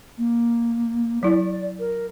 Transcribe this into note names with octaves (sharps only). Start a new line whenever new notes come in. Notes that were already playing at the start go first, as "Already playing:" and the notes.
A#3
F#3 E4 D5
A#4